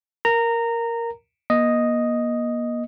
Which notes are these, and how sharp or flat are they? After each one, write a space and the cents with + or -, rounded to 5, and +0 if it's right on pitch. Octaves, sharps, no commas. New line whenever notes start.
A#4 +0 A#5 -15
A#3 +40 D#5 +0